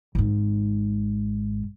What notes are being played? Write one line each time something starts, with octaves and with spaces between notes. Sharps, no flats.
G#1 G#2